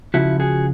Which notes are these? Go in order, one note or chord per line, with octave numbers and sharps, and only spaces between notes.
C#2 C#3 F3 E4 F#4
F#4 G#4